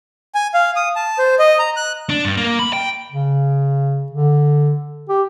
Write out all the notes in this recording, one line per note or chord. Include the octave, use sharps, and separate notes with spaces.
G#5
F5
D#6
A5
C5
D#5
A#5
F#6
D4
G2
A#3
B5
G5
C#3
D3
G4